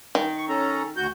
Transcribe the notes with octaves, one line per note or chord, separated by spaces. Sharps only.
D#3
C#6
C#4 A4 A#5
D2 F#4 G6